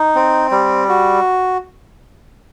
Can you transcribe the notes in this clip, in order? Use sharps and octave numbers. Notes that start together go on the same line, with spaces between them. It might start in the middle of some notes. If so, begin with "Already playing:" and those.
Already playing: D#4
C4
G3
F#4